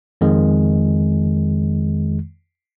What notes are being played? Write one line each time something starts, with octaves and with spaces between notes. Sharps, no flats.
F2 D#3 G#3